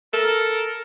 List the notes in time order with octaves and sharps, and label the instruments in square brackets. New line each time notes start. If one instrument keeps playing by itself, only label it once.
[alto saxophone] A4 [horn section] A#4